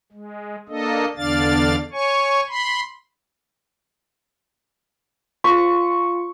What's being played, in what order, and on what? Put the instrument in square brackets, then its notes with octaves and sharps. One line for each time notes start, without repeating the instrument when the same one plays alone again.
[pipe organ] G#3
A#3 D4 A4 D#5
E2 D3 D4 D5 F5 A6
C#5 G#5 C#6
B5 C6
[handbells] F4 [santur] C#6